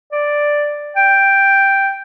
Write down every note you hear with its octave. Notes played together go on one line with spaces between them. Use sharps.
D5
G5